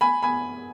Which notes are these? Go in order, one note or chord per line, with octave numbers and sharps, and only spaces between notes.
G#5 B5
G#5 B5